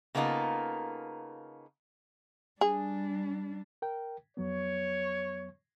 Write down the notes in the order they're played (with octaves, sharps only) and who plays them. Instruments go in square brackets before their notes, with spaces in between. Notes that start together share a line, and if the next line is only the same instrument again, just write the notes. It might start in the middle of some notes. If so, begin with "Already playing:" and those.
[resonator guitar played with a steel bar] C#3 A#3 B3 D#4 F4 A4
[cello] G3 D4 [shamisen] G#4
[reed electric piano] A#4 G5
[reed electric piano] F2 F#3 B3 [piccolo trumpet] C#5